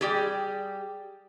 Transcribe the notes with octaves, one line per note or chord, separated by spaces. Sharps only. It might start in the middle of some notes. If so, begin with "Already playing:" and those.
G3 G4 G#4